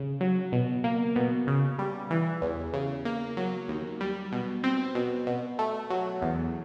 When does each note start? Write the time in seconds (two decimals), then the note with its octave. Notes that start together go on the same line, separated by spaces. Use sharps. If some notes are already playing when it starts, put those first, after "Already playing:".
Already playing: C#3
0.21 F#3
0.52 B2
0.84 A#3
1.16 B2
1.47 C#3
1.79 G3
2.11 E3
2.42 E2
2.74 C#3
3.05 A#3
3.37 F#3
3.68 D#2
4.01 G3
4.32 B2
4.64 C4
4.95 B2
5.27 B2
5.59 A3
5.90 F#3
6.22 E2